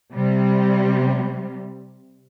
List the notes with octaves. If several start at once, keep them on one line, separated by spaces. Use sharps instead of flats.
C3 G3